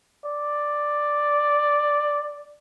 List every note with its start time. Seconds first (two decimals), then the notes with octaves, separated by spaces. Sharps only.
0.25 D5